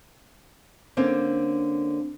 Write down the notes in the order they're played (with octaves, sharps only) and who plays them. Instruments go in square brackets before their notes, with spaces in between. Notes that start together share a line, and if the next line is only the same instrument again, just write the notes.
[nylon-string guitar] D3 A#3 C4 C#4